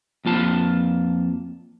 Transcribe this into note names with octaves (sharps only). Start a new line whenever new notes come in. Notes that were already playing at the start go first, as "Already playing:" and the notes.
F2 A#3 F4 A5